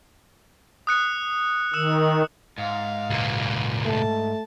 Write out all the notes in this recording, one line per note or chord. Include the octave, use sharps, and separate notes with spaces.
D#6 F#6 C#7
D#3 E6 E7
G#2 F5
C#2 A#2
A3 A5